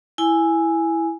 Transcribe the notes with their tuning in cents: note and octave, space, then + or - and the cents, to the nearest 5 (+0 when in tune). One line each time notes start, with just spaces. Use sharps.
E4 +0 G#5 +0